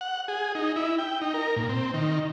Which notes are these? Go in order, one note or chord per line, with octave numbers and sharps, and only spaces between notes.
F#5
G#4
D#4
E4
G5
D#4
A#4
A#2
C4
D#3